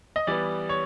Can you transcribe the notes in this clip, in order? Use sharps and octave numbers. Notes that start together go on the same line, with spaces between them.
D#5
E3 G3 B3 D5
C#5